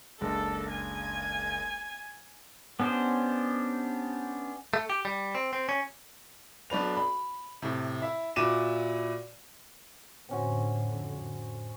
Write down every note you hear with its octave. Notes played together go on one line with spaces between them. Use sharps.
F#1 C#2 D4 A4
G#5
B3 C#4 D4 G4 C5
A3
G4
G3
C4
C4
C#4
B1 D4 B4 F7
B5
A2 C3
E4 E5
A#2 E4 F#4 D6 D#7 E7
F2 A2 D3 C4 C#4 F#4